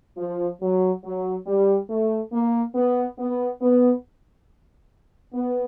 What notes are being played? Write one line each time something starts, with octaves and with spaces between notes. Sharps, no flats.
F3
F#3
F#3
G3
A3
A#3
B3
B3
B3
B3